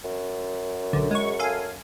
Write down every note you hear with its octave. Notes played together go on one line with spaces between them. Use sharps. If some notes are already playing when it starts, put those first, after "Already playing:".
F#2
B1 D3
G#3 C#6
A4 F5 G#5